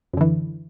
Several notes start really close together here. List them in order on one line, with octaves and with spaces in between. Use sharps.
F#2 D3 E3